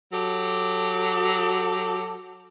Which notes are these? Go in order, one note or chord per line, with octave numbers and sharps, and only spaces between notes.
F#3 G4 A4